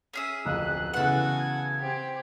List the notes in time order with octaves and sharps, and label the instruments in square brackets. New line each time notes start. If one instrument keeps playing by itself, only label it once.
[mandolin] C#4 G#4 E5
[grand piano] D1 F2 F4 [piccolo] F#6
[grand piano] C#3 E3 B3 [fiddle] F#4 G#5 [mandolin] A4 F#5
[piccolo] G#6
[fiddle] C4 G4